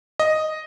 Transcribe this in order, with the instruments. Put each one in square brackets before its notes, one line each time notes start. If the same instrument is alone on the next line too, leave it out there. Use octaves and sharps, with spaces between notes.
[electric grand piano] D#5